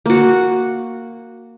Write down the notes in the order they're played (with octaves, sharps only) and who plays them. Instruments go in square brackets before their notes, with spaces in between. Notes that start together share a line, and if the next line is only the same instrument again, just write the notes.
[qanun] A#3 F#4